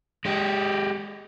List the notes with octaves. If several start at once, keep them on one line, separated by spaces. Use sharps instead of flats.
G#3 G4